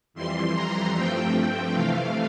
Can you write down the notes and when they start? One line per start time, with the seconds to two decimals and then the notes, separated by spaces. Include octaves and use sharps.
0.14 F2 E3 G3 C6
0.54 A#5
0.94 G2 F3 A3 C4 G5
1.34 G5
1.74 C3 E3 A3 F5